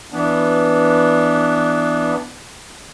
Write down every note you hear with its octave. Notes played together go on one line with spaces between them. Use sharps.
E3 B3 D4